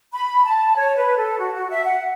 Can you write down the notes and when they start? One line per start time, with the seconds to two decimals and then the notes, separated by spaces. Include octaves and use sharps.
0.13 B5
0.44 A5
0.76 C#5
0.96 B4
1.16 A4
1.38 F#4
1.54 F#4
1.69 E5
1.84 F#5